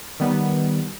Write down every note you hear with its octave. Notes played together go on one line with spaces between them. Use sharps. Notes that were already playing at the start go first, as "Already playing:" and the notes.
D#3 G3 B3